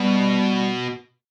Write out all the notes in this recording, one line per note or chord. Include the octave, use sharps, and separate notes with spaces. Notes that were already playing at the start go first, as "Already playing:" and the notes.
Already playing: B2 G3